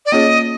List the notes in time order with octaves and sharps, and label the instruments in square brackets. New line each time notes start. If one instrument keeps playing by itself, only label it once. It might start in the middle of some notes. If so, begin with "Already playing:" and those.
[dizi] D5
[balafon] A#3 C#4 F4 G#4 C#5 [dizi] D#5